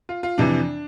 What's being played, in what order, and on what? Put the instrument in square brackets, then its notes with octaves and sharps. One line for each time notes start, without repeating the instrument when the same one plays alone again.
[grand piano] F4
F4
F2 C3 E3 D4